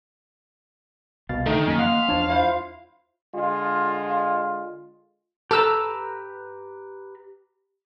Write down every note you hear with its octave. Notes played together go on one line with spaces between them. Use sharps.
C2 B2 F5 A6
D3 D#3 A3 D#4 G5
F#2 A#3 G#5 B6
D#5 F5 F#5 C6
E2 F3 D4 C#5 A5
E4 F4 C5
D3 G#3 F4
G4 A4 B4 A#5 E6